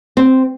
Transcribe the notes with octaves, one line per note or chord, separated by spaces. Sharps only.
C4